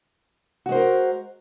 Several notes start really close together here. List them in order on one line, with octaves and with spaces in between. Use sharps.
F#4 G#3 C5 A#4